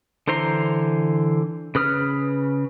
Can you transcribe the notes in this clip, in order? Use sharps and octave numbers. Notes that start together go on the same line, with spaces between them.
D3 E3 C5 A#5 C6
C#3 B4 D#6 F6